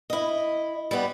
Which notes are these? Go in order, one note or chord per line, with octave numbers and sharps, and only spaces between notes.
E4 D#5
G3 B3